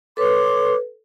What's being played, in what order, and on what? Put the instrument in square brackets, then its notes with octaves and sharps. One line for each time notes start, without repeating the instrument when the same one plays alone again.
[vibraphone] A4 B4 [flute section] C#5 C6 D6